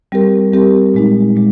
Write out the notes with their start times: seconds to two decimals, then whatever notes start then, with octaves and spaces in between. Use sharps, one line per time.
0.12 G3 C4 G4 A#4
0.53 G3 C4 G4 A#4
0.94 A#2 G#3 D#4
1.36 A#2 G#3